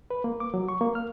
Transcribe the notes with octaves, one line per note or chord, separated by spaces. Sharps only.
B4
A#3
D6
F#3
C#6
A#3
F6